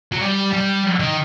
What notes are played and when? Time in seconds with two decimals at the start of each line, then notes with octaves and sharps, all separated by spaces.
0.12 F#3
0.21 G3
0.53 G3
1.00 D#3